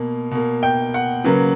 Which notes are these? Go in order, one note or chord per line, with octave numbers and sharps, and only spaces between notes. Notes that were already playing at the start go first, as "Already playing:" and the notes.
Already playing: B2 A#3
B2 A#3
G5
F#5
C#3 F#3 A#3 B4